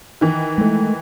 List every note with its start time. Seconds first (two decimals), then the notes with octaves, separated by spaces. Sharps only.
0.21 D#3 E3
0.58 G#3 A3